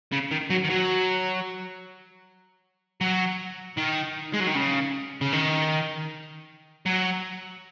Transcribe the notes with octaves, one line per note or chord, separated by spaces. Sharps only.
C#3
D#3
F#3
D#3
F#3
F#3
D#3
G#3
F#3
D#3
C#3
C#3
D#3
F#3